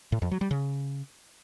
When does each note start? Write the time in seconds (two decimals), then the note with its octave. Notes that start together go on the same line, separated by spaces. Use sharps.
0.12 A2
0.22 F2
0.31 F#3
0.41 G3
0.51 C#3